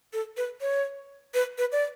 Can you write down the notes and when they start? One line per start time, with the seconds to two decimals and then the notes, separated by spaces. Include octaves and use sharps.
0.13 A4
0.37 B4
0.61 C#5
1.34 B4
1.58 B4
1.72 D5